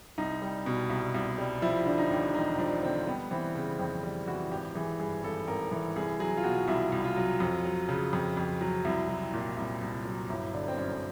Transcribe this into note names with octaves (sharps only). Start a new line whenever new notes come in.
C2 D#4
G3
B2
C2
C2
G3
F3 E4
D3 D4
D#4
D#2
E1 D#4
F3 D4
D3 C4
G3 B3
E3 C4
C#3 C4
F2 C4
G3
E3 F#4
G#1 G4
E3 G#4
G2 G#4
G#1 A4
G#1 A#4
E3 A#4
C2 G#4
F#3 G#4
F4
B2 F#4
C2 E4
C2
F4
F#3
F2
F#3
C#3
F2
F2
F#3
C2 E4
F#3
A#2
C2
C2
F#3
G1 E4
D3 D4
C4
F#2 C#4
C#4